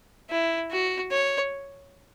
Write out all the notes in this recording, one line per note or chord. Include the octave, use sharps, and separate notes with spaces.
E4
F#4
C#5